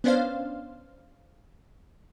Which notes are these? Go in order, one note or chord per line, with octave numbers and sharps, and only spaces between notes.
B3 C#4 D4 C5 F5